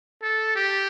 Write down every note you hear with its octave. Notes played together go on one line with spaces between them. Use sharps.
A4
G4